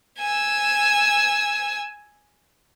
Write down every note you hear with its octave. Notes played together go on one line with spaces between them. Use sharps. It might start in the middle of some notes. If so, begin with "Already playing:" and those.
G#5 E6